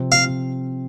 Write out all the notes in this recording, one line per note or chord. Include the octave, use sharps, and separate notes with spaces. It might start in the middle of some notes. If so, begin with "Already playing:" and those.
Already playing: C3 F3 C4
F5